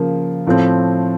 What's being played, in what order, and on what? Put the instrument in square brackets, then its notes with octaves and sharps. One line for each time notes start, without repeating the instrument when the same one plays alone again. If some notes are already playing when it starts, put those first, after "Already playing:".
Already playing: [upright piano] C#3 F3 A#3
A2 F3 A3 C4